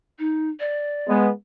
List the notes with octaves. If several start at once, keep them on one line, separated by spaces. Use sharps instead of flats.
D#4
D5
G#3 B3